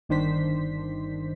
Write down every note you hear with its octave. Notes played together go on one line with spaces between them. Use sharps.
G1 D#3 D4 C5 B6